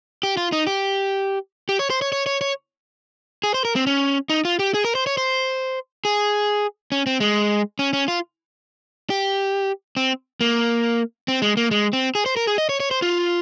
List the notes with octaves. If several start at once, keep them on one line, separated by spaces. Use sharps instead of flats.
G4
F4
D#4
G4
G4
C#5
C5
C#5
C#5
C#5
C#5
G#4
C5
A#4
C4
C#4
D#4
F4
G4
G#4
A#4
C5
C#5
C5
G#4
C#4
C4
G#3
C#4
C#4
F4
G4
C4
A#3
C4
G#3
A#3
G#3
C4
G#4
C5
A#4
G#4
D#5
C#5
C#5
C5
F4